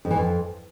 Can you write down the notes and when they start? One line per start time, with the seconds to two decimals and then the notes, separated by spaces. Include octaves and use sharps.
0.05 F2
0.11 E3
0.16 F2